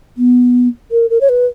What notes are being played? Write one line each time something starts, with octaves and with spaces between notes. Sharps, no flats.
B3
A#4
A#4
C#5
B4